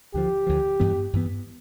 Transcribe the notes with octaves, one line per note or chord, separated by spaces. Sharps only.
D2 D3 F3 G4
D2 D3 F3
G2 E3 B3
G2 E3 B3